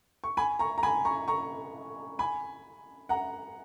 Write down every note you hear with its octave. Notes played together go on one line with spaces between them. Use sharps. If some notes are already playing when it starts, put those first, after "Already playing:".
C#6
G#5 B5
A#5 C#6
A#5
G#5 B5
A#5 C#6
A#5 C#6
G#5 B5
F#5 A#5